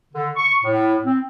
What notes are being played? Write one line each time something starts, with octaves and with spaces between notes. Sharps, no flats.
D3
C#6
A2
C4